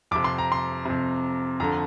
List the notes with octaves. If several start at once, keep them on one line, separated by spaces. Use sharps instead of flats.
F2 C3 D6
C6
A#5
C6
F2 C3
F2 D3 A#5